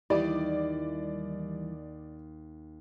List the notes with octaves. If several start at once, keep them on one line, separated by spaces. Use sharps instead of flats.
D#2 E3 G3 E4 D5